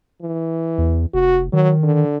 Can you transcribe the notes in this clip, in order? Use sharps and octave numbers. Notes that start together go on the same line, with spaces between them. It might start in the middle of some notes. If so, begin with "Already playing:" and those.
E3
E2
F1 F#4
D#3 F#3
D3